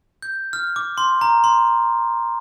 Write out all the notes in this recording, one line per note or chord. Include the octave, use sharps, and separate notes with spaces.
G6
F6
D6
C6
A#5
C6